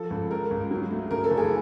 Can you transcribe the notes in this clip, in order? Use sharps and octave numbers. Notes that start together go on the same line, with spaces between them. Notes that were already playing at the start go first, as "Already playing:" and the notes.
Already playing: F3 A4
C#2
G#3 A#4
C#2
F#3
A3
C#3 A#4
A4
F#1
G#4